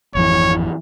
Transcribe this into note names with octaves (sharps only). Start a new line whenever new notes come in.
G#1 F2 E3 C#5